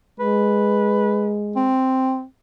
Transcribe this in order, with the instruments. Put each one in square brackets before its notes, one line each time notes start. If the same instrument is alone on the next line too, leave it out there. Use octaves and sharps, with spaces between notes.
[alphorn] G#3 [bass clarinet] B4
[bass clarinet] C4